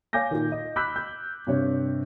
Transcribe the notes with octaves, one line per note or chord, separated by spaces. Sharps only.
C#5 F5 G#5 D6 G6 A#6
A#2 D#3
D#5
B5 D6 E6 F#6 G6 B6
G6
G2 C3 C#5